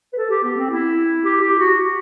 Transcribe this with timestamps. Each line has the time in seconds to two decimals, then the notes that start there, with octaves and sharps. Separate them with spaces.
0.13 B4
0.18 A4
0.30 G4
0.44 B3
0.57 C4
0.71 E4
1.24 G4
1.41 G4
1.59 F#4